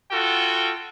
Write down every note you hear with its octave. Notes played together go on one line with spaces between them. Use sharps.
F4 F#4 A4 G5